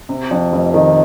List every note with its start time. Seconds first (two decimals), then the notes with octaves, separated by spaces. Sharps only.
0.09 C3
0.31 F2
0.52 F1
0.74 D#3